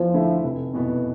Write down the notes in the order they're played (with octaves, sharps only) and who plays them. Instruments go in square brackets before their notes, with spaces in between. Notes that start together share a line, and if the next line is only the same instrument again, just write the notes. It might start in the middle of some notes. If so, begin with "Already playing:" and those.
Already playing: [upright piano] E2 [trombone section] F3
[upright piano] D3 A3 E4
F1
E2 B2 B3